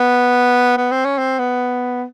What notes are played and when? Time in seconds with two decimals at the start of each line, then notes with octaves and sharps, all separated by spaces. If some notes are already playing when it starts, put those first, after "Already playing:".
Already playing: B3
0.77 B3
0.91 C4
1.05 C#4
1.18 C4
1.39 B3